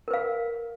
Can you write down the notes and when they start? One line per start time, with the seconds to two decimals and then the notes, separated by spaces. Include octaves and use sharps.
0.08 A#4
0.11 B4
0.13 F5